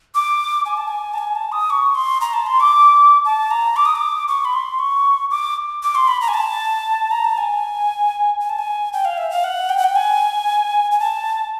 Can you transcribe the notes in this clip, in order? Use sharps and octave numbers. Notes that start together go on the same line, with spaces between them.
D6
G#5
A5
G#5
A5
G#5
A5
D#6
C#6
C6
A#5
A5
C6
D6
A5
A#5
D6
D#6
D6
C#6
B5
C6
C#6
D6
D6
C6
B5
A#5
G#5
A5
A#5
A5
G#5
G#5
A5
G#5
G5
F5
E5
F5
F#5
G5
F#5
G5
G#5
G#5
A5